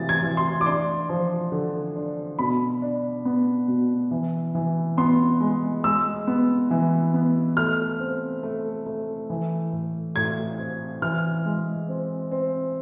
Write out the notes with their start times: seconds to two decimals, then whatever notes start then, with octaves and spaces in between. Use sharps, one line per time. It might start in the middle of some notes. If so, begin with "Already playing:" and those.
Already playing: C3 E3 A6
0.09 G#6
0.23 E3
0.37 C6
0.61 D6
0.66 D4 C6
1.09 F3
1.52 D3
1.96 D4
2.39 B2 B5
2.82 D4
3.25 B3
3.68 B2
4.11 E3
4.55 E3
4.97 B3 C6
5.41 G#3
5.84 G#3 E6
6.27 B3
6.71 E3
7.14 B3
7.57 A3 F6
8.00 C4
8.43 A3
8.86 A3
9.30 E3
9.72 A2
10.16 A2 G#6
10.59 C4
11.02 E3 F6
11.45 G#3
11.89 C4
12.31 C4